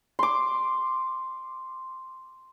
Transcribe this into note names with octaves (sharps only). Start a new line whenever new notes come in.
C6 D6